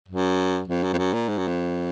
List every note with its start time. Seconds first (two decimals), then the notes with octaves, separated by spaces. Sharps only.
0.08 F#2
0.68 F2
0.83 F#2
0.93 F2
0.98 F#2
1.13 A#2
1.28 G#2
1.38 F#2
1.48 F2